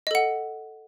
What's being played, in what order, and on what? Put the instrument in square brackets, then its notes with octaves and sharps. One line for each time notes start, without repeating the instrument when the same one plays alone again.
[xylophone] D#5
A4
F#5